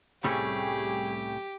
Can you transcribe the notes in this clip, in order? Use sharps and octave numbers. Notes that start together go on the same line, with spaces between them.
C2 A2 G3 A3 C4 C#4 G4 G#4